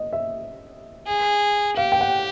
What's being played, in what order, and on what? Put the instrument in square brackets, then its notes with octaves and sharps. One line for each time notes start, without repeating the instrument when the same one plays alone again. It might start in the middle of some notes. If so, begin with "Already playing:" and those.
Already playing: [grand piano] D#5
E5
[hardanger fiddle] G#4
[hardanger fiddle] G4 [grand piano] F5
[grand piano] G5
F#5